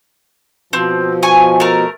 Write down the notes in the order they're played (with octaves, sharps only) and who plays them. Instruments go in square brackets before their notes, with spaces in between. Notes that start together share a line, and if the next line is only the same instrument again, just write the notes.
[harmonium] B2 F3 [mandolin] C4
[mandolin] G#5 C#6
A3 A#4